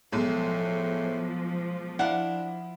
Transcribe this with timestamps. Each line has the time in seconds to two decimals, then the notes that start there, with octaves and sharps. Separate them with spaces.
0.12 B1 A2 F3 G#3
1.99 D4 E4 F5 F#5